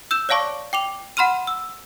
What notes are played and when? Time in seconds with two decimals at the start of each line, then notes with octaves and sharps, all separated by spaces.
0.11 E6 G6 E7
0.29 C#5 D5 F5 A5 C#6 D6
0.73 G5 D6 F7
1.17 F#5 B5 C6 F6 D#7
1.47 E6